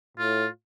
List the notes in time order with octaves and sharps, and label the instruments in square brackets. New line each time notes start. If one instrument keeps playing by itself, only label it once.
[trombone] A2 [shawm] F4